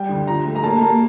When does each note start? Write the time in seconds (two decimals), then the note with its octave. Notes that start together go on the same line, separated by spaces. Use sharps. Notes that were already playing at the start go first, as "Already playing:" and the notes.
Already playing: G3 G5
0.09 D2
0.27 F3 A#5
0.45 A3
0.55 A#5
0.64 A#3 A5
0.81 A#3